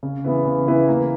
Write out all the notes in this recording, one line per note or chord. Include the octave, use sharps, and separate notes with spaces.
C#3
E3 B3 E4 B4
C#3
E3 B3 E4 B4
A#3